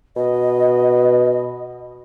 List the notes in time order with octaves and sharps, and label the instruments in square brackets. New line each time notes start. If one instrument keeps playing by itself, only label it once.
[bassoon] B2 [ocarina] D#5